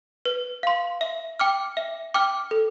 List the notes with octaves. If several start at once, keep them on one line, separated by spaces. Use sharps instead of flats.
B4
F5 C6
E5
G5 D6 F6
E5
G5 D6 F6
A4